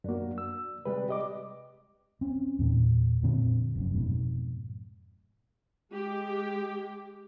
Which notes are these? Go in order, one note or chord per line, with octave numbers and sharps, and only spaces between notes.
F#2 A#3 D4 F#4
E6
C3 G3 G#3 B4
G4 D#5 D6
C4 C#4
E2 A#2
F2 A#2 D3 C4
F1 F#2
F2 G#2 B2
G#3 G4